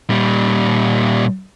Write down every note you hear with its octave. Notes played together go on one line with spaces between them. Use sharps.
A#2 G3